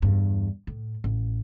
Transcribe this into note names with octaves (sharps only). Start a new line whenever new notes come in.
E2 G2
A2
A1